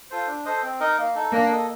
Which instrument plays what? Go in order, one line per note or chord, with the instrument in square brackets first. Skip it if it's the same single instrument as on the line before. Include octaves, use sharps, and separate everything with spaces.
[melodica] F4 A4 C5
D4
A4 C5 D#5
C4
D#4 A#4 D#5
A#3
D#4 A4
[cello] A#3 [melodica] D4
[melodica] A4 D#5